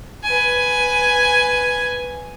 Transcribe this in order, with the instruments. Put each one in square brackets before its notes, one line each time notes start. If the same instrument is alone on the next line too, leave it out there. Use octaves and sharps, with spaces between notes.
[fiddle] B4 G#5